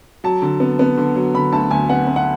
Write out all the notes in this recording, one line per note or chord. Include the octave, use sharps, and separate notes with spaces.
F#3 A5
D3
B3
B3
D3
F#3
D3 B5
D2 A5
D2 G#5
B3 F#5
B3
F#5